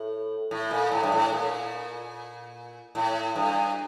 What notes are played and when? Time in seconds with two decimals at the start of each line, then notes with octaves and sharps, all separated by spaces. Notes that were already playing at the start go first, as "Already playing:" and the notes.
Already playing: A2
0.51 A2
0.71 A#2
0.92 A2
1.03 G2
1.12 A2
1.33 A#2
2.95 A2
3.35 G2